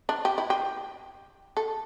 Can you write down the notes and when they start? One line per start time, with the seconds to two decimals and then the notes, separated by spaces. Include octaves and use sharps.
0.09 D4
0.25 G4
0.38 E4
0.50 G4
1.57 A4